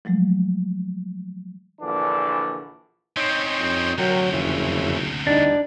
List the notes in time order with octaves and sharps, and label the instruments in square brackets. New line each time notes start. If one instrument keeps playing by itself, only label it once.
[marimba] F3 F#3 G#3 A3
[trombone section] A#1 D3 E3 D4
[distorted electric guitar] C4 C#4 [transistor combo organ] D#4 C#5 C6
[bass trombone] F2
[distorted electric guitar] D2 C3 [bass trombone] F#3 [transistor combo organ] A#4 G5
[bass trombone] F#1 [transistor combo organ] F2 C#3 E3
[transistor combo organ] E2 G3 [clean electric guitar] D4 [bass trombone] D#4